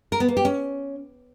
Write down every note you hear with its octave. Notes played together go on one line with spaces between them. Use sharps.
A#4
B3
A#3
G4
C#4